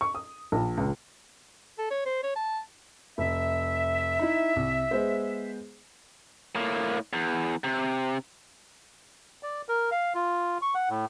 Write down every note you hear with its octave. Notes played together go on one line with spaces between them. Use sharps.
C#6
D#6
A#1
C#2
A4
C#5
C5
C#5
A5
F1 E5
D#4 E4
C2
G#3 B3 C5
A2 A#3
E2
C3
D5
A#4
F5
F4
C#6
F#5
A2